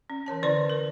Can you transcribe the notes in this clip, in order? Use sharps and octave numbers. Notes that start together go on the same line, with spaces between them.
C#4
E3 A#4 C#5 A5
D3 C#4 E4 C5 D5 C6
A#4